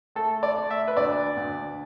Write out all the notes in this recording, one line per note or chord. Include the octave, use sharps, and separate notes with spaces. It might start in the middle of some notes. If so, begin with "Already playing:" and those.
A3 A4
D5
A3
E5
B4
D2 D5
D2